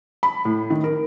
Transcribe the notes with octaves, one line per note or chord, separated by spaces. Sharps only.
B5
A2
D#3
A#4